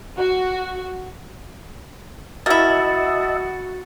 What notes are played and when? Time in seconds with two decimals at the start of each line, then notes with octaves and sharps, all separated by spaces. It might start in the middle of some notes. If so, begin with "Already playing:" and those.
0.17 F#4
2.46 A#3 E4 F#4 D#5 E5 A5 A6